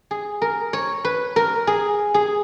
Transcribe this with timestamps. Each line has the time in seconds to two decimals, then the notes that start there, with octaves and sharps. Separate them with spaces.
0.11 G#4
0.42 A#4
0.73 C#5
1.05 B4
1.36 A#4
1.67 G#4
2.14 G#4